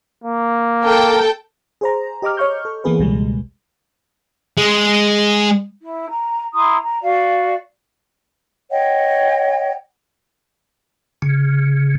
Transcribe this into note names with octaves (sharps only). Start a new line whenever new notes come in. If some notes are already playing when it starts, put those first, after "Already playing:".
A#3
A4 A#4 G5
G#4 C5 A#5
G4 D#5 A#5 D6 F6
C#5 D#5 C#6 F6 G6
A4
E3 A#3 B3 G#4 B4
C#2 B2 G3 G#3
G#3
E4
A#5
E4 A#5 C6 D#6
A#5
F#4 D5 F5
C#5 D#5 F#5 G5
C#3